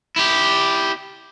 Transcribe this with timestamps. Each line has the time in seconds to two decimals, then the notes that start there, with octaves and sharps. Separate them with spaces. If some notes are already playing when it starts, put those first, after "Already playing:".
0.16 E4 G4